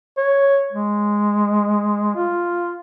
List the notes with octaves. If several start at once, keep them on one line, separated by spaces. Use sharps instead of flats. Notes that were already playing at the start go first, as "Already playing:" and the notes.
C#5
G#3
F4